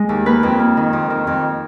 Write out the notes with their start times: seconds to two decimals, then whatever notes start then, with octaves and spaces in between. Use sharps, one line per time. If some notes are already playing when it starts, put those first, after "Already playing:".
Already playing: G#3
0.09 D#2
0.26 A#3 B4
0.43 F2
0.59 A#3
0.77 D#3
0.93 F2
1.10 D#3
1.27 F2